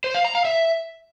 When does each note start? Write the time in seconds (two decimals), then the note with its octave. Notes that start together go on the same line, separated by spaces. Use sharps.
0.04 C5
0.14 F5
0.25 A#5
0.35 F5
0.45 E5